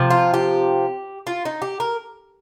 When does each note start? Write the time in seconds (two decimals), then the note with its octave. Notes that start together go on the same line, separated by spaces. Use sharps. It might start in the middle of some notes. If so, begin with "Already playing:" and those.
Already playing: C3 F3
0.10 F4
0.34 G4
1.27 F4
1.45 D#4
1.62 G4
1.80 A#4